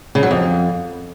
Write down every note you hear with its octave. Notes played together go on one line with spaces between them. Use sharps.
C#3
F#3
F2